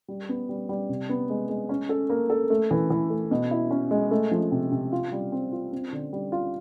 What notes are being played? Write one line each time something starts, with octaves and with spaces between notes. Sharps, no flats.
G3
B3
G3
G3
C3
B3
G#3
G#3
C#4
A4
A#3
A4
A3
E3
E3
A3
B2
E4
C#4
G#3
A3
F3
C3
C3
F4
G3
C4
F4
C4
D3
G3
F4